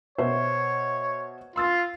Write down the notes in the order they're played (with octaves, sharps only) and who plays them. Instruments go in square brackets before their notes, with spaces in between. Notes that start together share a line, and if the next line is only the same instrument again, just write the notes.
[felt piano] B2 C5 E5 [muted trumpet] C#5
[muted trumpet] F4 [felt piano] C6 E6 A6